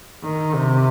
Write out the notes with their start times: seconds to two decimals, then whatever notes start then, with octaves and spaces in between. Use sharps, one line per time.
0.23 D#3
0.54 C3